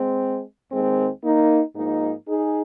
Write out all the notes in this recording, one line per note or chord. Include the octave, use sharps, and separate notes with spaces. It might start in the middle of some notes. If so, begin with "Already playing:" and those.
Already playing: G#3 C4
D#2 D#3 G#3 C4
A#3 D#4
G#2 F3 A#3 D#4
D#4 G#4